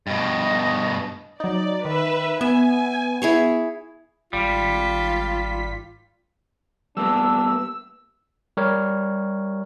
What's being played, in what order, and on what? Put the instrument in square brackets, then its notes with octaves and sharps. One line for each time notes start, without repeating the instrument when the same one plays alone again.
[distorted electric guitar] G2 B2 [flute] D#5
[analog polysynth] F#3 D#4 [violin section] D5
[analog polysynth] D#3 [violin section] B4 E5
[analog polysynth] B3 [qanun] E5 [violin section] G#5
[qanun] E4 G#4 C#5
[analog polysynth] G#1 B6 [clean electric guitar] G3 [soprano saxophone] F4
[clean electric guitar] G3 A#3 B3 [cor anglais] D4 [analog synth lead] E6
[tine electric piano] G3 G4 A#4 C#5